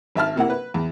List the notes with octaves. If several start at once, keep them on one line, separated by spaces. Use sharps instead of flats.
G#1 E5 A5 F6
C3 A#3 E4 F#5
B4
E2